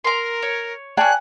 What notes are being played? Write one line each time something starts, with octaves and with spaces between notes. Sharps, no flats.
A#4 A#5 C6
C#5
C#4 G#4 D5 G5 A5 F#6